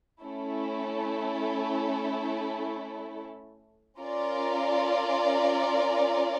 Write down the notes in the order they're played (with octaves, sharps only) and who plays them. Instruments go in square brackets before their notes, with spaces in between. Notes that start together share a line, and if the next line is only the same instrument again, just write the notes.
[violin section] A3 C#4 E4 A4
C#4 F4 A#4 D5